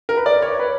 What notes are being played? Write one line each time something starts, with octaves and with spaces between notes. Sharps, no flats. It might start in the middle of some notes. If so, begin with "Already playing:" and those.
A#4
B4
D5
C#5
B4